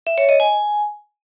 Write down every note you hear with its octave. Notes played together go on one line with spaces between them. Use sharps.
E5
C#5
D#5
G#5